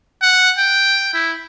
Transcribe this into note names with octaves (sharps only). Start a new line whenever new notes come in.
F#5
G5
E4